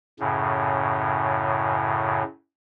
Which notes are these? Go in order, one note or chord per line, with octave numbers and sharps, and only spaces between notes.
F#2 A2 C#3